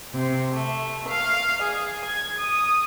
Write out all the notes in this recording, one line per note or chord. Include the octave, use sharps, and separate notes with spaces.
C3
A3
F5
G#4
G#6
D#6